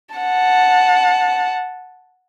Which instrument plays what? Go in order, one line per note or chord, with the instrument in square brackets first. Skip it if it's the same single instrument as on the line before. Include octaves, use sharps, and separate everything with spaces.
[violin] F#5 A5